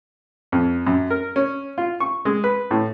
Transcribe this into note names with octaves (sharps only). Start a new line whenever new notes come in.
F2
F#2
A#4
C#4
F4
C#6
G#3
B4
A2